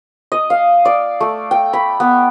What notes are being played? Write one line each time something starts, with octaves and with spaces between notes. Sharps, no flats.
D#5
F5
D5
A3
G5
B5
B3